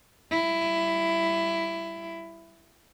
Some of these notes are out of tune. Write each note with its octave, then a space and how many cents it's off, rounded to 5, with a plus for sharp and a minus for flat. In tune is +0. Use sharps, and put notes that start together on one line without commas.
G3 -20 E4 +15